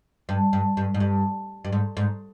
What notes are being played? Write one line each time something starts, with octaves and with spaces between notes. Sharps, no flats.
G2
G2
G2
G#2
G2
G2
G#2
G#2